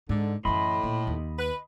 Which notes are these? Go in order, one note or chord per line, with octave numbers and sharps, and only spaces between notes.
G#2 D3
F#2 A2 E3 D#5 B5 C6
A#2
D#2
B4